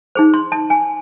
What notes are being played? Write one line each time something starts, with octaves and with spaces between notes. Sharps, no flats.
D#4 G#4 C5
C6
A5
G#5